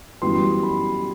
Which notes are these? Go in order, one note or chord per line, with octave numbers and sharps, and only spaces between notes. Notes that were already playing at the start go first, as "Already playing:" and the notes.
F#2 E3 G3 B3 C6
B5